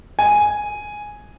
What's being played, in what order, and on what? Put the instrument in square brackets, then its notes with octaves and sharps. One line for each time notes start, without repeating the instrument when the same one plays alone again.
[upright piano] G#5